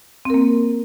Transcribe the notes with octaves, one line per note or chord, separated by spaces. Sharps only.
A#3 C4 A#4